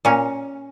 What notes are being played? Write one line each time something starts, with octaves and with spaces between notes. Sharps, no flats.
A#2 C#4